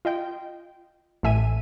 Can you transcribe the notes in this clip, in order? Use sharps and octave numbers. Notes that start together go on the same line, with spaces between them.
F4 D#5 G5
A1 A2 E5 G#5 D#7